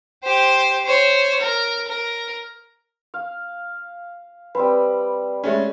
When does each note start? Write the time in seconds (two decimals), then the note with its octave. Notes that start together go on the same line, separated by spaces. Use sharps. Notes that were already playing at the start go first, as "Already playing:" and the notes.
0.24 G4 C5
0.85 C5 C#5
1.40 A#4
1.87 A#4
3.14 F5
4.55 G3 C4 B4 B5
5.44 G#3 A3 C#4